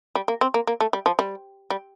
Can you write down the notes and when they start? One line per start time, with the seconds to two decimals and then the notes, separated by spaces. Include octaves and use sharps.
0.15 G3
0.28 A#3
0.41 C4
0.54 A#3
0.67 A#3
0.81 A3
0.93 G3
1.06 F3
1.19 G3
1.70 G3